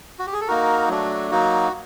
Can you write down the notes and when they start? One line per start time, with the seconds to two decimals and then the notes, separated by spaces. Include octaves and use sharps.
0.19 F#4
0.27 G4
0.33 G#4
0.41 A4
0.48 A#3 D#4 F#4 A#4
0.89 F#3 A3 D4 F#4
1.31 F#3 A#3 D#4 F#4